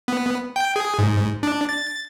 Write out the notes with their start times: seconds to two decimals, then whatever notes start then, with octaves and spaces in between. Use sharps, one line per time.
0.08 B3
0.56 G5
0.76 G#4
0.99 G#2
1.43 D4
1.69 A6